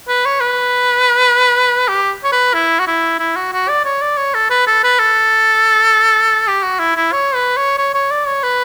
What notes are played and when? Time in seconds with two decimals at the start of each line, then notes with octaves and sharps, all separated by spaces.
0.08 B4
0.25 C#5
0.41 B4
1.89 G4
2.24 C#5
2.32 B4
2.54 E4
2.80 F#4
2.87 E4
3.19 E4
3.36 F#4
3.53 F#4
3.69 D5
3.85 C#5
4.02 D5
4.17 C#5
4.34 A4
4.50 B4
4.67 A4
4.84 B4
4.99 A4
6.48 G4
6.63 F#4
6.79 E4
6.96 E4
7.13 C#5
7.35 B4
7.57 C#5
7.78 C#5
7.95 C#5
8.11 D5
8.27 C#5
8.43 B4